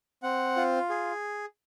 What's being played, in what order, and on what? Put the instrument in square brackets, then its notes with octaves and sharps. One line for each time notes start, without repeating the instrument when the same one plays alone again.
[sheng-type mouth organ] C4 F#5
F4
G#4